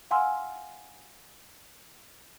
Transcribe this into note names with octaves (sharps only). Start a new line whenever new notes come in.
F5 F#5 G#5 C6 E6 F6